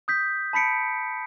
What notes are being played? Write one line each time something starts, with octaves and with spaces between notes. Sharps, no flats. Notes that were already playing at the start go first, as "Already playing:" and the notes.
D#6 G6 B6
A5 B5 B6 C#7 D7